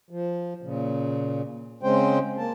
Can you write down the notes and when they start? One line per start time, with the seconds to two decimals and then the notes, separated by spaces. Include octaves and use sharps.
0.10 F3
0.63 A#2 C#3
1.83 C#3 G#3 C4 C#4 C5 G5
2.38 A#3 A5